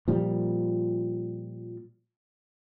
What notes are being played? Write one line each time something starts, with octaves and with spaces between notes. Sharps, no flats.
A#2 F3 G3